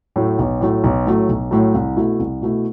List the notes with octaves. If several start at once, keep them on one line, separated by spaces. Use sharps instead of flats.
A2 F#3 A3
B1
A2 F#3 A3
B1
A2 F#3 A3
B1
A2 F#3 A3
C2
B2 A3 E4
C2
B2 A3 E4